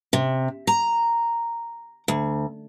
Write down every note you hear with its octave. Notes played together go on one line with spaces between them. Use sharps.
C3
A#5
D2